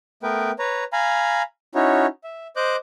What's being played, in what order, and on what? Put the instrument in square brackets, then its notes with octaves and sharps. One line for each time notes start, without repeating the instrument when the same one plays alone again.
[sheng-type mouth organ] A3 B3 A#4 B4 G5
B4 C#5 A#5
F5 G#5 A#5 B5
C#4 D#4 E4 F#4 C#5
E5
C5 D#5 D6 F#6 G6